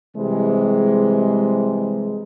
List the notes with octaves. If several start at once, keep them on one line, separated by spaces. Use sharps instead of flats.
C3 E3 G3 G#3